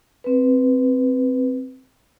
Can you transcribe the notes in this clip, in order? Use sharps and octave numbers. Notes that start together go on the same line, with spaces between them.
C4 B4